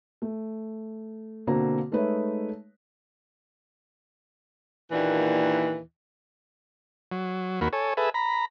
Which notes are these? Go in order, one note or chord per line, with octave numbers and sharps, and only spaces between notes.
A3
B2 D3 A#3 C4 F#4 A#5
G#3 A3 D#4 B4 C#5 E5
D#2 A#2 E3 D4
F#3
D#2 A#3 F#4 B5
A4 C#5 G#5
G#4 A4 B4 E5
A#5 B5